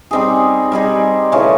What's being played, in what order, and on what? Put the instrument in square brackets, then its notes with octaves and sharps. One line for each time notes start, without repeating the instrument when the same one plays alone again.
[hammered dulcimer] G3 C4 D#4 G#4
G3 C4 D#4 G#4
C#3 E3 A3 C#4